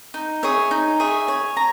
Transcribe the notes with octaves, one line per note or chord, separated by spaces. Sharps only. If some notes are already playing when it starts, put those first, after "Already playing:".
D#4
G#4 C#5 E5
D#4
G#4 C#5 E5
C#5
A#5